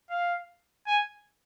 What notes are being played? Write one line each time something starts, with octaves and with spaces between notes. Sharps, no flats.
F5
G#5